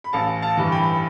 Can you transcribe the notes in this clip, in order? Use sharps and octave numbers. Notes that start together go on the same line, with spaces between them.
B5
A1 F5 A5
F5 A5
G2 E3
G5 B5